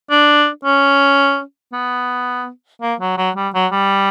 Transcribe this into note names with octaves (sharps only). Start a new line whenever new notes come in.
D4
C#4
B3
A#3
F#3
F#3
G3
F#3
G3